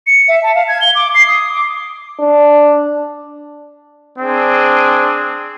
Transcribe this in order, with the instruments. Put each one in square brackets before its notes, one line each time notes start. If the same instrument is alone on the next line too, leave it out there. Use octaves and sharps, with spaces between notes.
[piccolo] C#7
E5
A5
F5
G#6
G7
D6
C7
D#6
D6
[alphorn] D4
[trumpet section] C4 D4 G#4